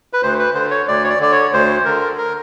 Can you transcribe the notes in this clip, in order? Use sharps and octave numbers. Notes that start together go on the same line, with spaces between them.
B4
D2 C5
B4
D3 C5
C#5
D2 D5
C#5
D5
D3 D5
C#5
D2 C5
D3 A#4
A#4